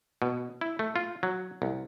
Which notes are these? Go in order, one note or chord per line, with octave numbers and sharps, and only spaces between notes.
B2
E4
A3
F4
F#3
C2